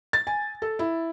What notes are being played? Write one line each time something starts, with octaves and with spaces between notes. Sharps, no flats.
A6
G#5
A4
E4